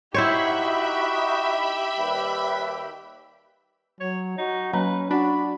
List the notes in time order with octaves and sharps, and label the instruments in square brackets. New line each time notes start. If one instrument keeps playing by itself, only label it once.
[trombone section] D#4 F#4 [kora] E4 C5 C#5 [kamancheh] G4 [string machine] E5 B5
[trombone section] D#2 G3 B4
[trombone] F#3 [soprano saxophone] C#5
[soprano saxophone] D#4 [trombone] F#4
[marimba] F#3 A#3 A#5 [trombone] C#4 [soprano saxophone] B4
[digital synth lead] D4 [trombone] F#4 [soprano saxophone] B5